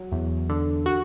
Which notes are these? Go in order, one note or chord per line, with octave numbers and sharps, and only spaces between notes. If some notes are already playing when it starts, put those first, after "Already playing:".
Already playing: F#3
E2
D3
F#4